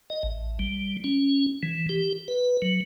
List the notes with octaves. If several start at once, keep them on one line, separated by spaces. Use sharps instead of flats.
D#5
A1
G3
C#4
E3
G4
B4
F#3